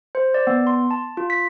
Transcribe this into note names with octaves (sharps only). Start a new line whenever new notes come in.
C5
D5
B3
C6
A5
F4
B6